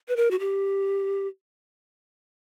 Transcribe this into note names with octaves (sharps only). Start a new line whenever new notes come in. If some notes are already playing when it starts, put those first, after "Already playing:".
B4
A#4
F#4
G4